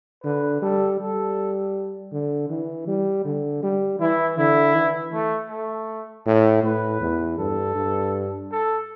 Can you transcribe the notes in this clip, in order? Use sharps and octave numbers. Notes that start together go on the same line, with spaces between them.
D3 B4
G3 A4
G3 A4
D3
E3
G3
D3
G3
E3 E4
D3 E4
E3
A3
A3
A2
A2 B4
E2
G2 A4
G2
A4